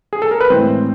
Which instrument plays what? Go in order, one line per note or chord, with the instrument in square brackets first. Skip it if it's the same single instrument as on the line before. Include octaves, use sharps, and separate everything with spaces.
[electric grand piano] G#4
A4
A#4
B4
A2 E3 G#3 C4 C5